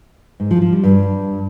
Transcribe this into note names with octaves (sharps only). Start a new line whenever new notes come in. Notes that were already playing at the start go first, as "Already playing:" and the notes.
G#2
F3
F3
G3
G2